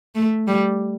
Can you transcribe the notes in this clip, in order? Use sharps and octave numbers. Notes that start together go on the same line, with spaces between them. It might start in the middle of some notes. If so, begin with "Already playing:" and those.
A3
G3